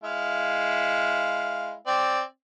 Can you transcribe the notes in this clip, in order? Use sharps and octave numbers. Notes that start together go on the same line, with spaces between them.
G#3 E4 F5
C4 D5